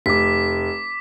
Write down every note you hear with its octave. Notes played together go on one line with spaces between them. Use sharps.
F1 D6 B6